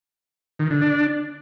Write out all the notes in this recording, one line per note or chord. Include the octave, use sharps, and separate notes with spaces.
D#3
D3
D4